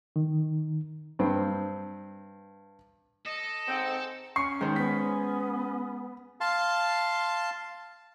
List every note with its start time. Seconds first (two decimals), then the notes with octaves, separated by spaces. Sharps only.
0.16 D#3
1.19 G2 C4
3.26 A4 D#5
3.66 G#2 C4
4.36 C#4 C#6 C7
4.61 D#3 G#3 C5
4.76 B3 B6
6.41 F5 A5 C6